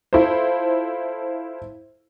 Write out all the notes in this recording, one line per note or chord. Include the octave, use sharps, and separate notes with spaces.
E4 F4 A4 C5